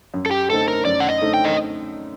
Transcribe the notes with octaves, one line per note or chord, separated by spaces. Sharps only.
F#2
A4
G4
D3 A3 C4 D#4 A4
A#4
F#2 D5
F#5
D#5
D3 A3 C4 D#4
G5
D#5